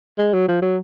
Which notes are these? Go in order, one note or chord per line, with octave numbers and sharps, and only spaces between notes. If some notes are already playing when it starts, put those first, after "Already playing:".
G#3
F#3
F3
F#3